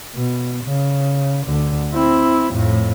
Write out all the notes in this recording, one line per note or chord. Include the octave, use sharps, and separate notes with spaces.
B2
C#3
D2 D3
C4 E4
F2 A2